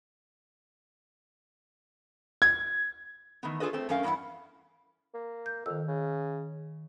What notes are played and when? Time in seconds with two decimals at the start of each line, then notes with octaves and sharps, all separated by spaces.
2.42 G#6
3.43 D#3 E3 A3 B3
3.60 D4 F4 G#4 A4 B4 D#5
3.73 A3 C4
3.89 F#2 A3 C#4 A#4 F5
4.03 E2 G2 F3 E4 F#5
5.14 A#3
5.46 G6
5.66 F2 D#3 E6
5.88 C#3